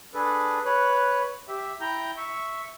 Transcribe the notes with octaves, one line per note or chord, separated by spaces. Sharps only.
D4 G#4 A4 B4
B4 C#5 F#6
G4 E5
E4 G5 A#5 G6
E5 C#6